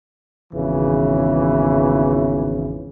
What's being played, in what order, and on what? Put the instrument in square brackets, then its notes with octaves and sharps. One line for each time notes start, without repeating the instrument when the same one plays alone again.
[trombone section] G#1 E2 C#3 E3